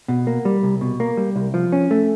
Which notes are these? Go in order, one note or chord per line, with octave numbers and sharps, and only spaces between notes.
B2
A#3
G3
C2
B2
A#3
G3
C2
F3
C#4
A3